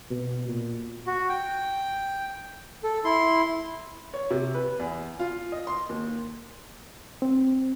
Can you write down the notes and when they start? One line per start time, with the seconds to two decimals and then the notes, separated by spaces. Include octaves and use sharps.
0.10 B2
0.48 A#2
1.07 F#4
1.29 G5
2.84 A4
3.05 E4 C6
4.14 C#5
4.31 C3
4.55 B4
4.79 E2
5.19 F4
5.52 D#5
5.67 C6
5.89 D#2
7.22 C4